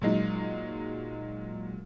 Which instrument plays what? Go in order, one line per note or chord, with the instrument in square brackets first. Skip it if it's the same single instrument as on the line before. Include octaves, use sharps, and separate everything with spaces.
[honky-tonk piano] A#2 F#3 G#3 D#4